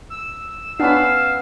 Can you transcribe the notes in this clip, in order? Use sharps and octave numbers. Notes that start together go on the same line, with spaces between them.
E6
B3 C#4 D4 F5 B5